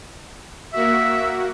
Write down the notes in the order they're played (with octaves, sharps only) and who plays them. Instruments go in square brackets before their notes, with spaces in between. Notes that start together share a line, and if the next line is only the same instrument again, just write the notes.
[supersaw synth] A#3 F#4 [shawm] E5